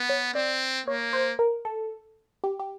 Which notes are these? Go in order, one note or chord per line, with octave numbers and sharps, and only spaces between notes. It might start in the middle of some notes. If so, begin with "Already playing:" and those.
Already playing: B3
C#5
C4 D5
A#3 C#5
C5
A#4
A4
G4
G4